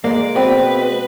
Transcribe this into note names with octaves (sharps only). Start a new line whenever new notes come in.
G#3 A#3 D5
B2 C4 B4